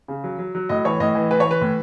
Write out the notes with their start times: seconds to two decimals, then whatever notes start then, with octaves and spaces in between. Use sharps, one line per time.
0.08 C#3
0.24 F#3
0.39 F#3
0.55 F#3
0.69 A2 D#5
0.85 E3 C#5
1.00 A2 D#5
1.15 E3
1.31 E3 B4
1.40 C#5
1.45 E3
1.51 B4
1.61 A2